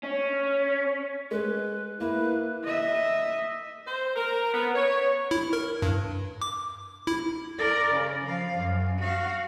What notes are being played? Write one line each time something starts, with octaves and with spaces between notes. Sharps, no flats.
C#4
G#3 B4
A#3 E4 B4
D#5 E5
C5
A#4
B3
C#5
E4
A#4
G2
D6
E4
A#4 D5
C#3
F3 F5
F#2
F#4 F5